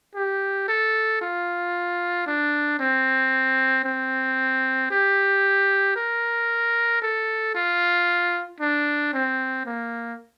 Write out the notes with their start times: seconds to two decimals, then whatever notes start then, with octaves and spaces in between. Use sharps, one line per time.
0.15 G4
0.68 A4
1.21 F4
2.26 D4
2.79 C4
3.84 C4
4.91 G4
5.96 A#4
7.02 A4
7.55 F4
8.60 D4
9.13 C4
9.66 A#3